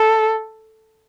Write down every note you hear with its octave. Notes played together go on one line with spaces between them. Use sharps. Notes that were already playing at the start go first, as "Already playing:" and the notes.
Already playing: A4